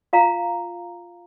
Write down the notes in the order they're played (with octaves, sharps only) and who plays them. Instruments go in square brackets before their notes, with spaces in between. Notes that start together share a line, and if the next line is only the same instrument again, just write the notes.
[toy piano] F4 F5 A#5